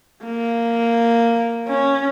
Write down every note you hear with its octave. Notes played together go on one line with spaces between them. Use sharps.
A#3
C#4